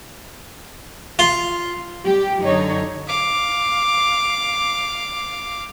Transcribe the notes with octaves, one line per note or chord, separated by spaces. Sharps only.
F4
G3 G4
F#2 D3 D#4 C#5
F5 D6